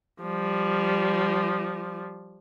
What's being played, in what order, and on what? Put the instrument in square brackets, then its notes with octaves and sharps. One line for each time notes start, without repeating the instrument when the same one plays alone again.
[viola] F3 G3